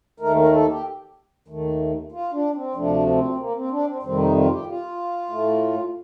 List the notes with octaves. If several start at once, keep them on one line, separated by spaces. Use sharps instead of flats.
D#2 D#3 A3 A#4
A#4
A4
G4
D#2 D#3 A3
F4
D4
C4
D2 C3 F3 A3 D4
C4
A#3
C4
D4
C4
F2 C3 D#3 G3 C4
D#4
F4
G4
F4
A2 A3